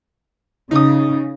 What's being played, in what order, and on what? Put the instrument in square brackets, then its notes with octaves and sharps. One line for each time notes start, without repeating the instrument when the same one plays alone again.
[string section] C#3 [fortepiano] D#4 D#6